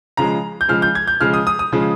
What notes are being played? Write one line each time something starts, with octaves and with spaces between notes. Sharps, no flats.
C#3 F3 G#3 A#5
G6
C#3 F3 G#3 F6
G6
G#6
G6
C#3 F3 G#3 F6
D#6
D#6
D#6
C#3 F3 G#3